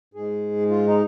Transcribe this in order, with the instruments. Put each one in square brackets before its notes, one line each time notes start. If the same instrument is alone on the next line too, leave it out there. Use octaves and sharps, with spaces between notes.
[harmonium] G#2 G#3 G#4
F4
D#4